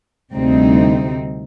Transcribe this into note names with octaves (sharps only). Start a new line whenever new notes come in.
D2 C3 G3 C4 D#4